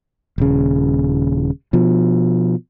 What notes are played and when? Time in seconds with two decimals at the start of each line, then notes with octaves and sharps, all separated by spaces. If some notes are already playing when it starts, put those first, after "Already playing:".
0.38 D#1 C#3
1.73 B2 F3